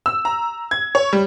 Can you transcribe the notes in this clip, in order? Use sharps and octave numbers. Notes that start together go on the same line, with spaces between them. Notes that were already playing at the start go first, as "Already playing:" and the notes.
E6
A#5
G#6
C#5
G3